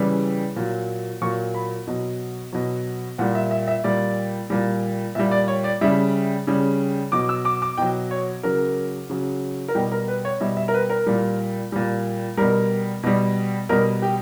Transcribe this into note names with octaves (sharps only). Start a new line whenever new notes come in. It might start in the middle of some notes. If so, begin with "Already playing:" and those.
Already playing: C#3 E3 G3
A#2 F#3
A#2 F#3 C#6
B5
B2 F#3
B2 F#3
A#2 G3 F#5
E5
E5
E5
A#2 G3 D5
A#2 G3
A#2 G3 E5
D5
C#5
D5
C#3 G3 E5
C#3 G3
B2 F#3 D6
E6
D6
D6
B2 F#3 G5
C#5
C#3 F#3 A#4
C#3 F#3
A#4
B2 G3 G4
A#4
B4
C#5
B2 G3 E5
E5
A#4
B4
A#4
A#2 G3
A#2 G3
B2 G3 A#4
B2 G3
B2 G3 A#4
G4